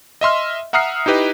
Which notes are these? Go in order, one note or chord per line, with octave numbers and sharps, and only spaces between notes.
D#5 E5 C6 F6
E5 F#5 A#5 D#6 F6 C7
D#4 E4 G4 B4 D#5